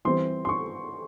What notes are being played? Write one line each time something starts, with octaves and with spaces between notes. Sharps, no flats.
E3 G3 C4 C6
C6
C#6